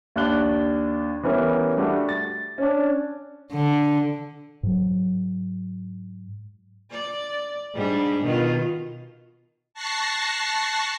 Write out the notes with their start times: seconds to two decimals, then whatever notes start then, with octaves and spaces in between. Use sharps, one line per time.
0.16 D#2 D4 F#6 G7
1.23 E3 G3 B3 C#4 A#4
1.77 G3 A3 D4 F#4
2.09 A6
2.58 C#4 D4
3.53 D3
4.63 G#2 F#3
6.91 D5
7.74 G#2 G3 D4
8.23 B2 D#3 F4
9.74 A5 C#6 F#6 A#6 C7